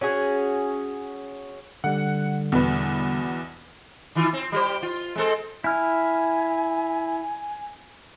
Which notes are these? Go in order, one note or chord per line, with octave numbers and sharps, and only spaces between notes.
C#4 F#4 G#4
D3 G3 F#5
E2 B2 B4
D#3 E3 F4
C4
G3 G4 C5
F4
G#3 C4 A4
E4 G#5 F6